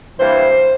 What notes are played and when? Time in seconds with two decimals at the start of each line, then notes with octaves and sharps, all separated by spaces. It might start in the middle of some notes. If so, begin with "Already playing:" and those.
0.18 G2 E3 A#3 C5